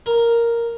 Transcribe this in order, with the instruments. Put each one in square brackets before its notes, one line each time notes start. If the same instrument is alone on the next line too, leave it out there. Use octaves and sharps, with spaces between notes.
[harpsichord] A#4